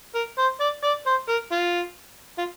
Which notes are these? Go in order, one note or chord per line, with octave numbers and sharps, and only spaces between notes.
A#4
C5
D5
D5
C5
A#4
F4
F4